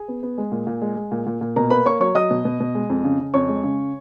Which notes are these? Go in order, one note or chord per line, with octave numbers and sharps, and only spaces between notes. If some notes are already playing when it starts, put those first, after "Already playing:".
Already playing: G#4 G#5
B3
B3
G#3
A#2
A#2
G#3
G#3
A#2
A#2
A#2
B2 A#4 A#5
A#3 B4 B5
A#3 C#5 C#6
F#3 C#5 C#6
F#3 D#5 D#6
B2
B2
B2
G#3
F2
C#3
C#3
F2 C#5 C#6
G#3
C#3